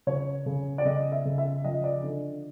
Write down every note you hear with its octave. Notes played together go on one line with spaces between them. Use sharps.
C#3 C#5
C#3
D5
C#3 D#5
E5
C#3
E5
F3 D#5
D5
D3